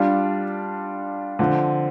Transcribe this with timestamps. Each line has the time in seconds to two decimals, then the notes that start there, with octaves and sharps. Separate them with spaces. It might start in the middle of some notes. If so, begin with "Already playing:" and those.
Already playing: G3 D4 F4
1.39 D3 F3 C4